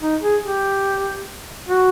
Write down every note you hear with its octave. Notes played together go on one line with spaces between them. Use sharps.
D#4
G#4
G4
F#4